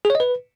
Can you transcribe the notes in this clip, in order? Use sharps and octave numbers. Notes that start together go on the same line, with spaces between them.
G#4
C#5
D#5
B4